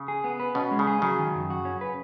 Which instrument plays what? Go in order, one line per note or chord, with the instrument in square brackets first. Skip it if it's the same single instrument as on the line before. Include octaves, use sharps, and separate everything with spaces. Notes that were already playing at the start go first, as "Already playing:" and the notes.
Already playing: [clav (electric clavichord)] C#3
[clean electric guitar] G#4
B3
B4
[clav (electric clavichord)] B2 [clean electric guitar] C#4
[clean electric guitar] G#3
[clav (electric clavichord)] C#3
[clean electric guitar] G#4
[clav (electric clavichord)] C#3 [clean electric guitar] F#3
[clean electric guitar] D#3
F#2
F#4
C#4
B4